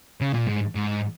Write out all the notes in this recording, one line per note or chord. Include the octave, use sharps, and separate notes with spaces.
C#3
A#2
G#2
G#2